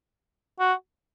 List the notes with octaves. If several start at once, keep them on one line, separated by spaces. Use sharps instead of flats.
F#4